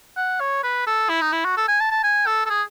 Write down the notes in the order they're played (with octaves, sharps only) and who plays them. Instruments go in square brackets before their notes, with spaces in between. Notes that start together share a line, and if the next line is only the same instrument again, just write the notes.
[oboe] F#5
C#5
B4
A4
E4
D#4
E4
F#4
A4
G#5
A5
A5
G#5
A4
A4
G#4